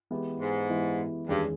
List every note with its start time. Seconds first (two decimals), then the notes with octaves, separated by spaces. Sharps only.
0.11 E3 G#3 B3 E4 G4
0.40 G#2
0.69 E3 G#3 B3 E4 G4
1.28 E2 G2 D#3 G#3 C#4 G#4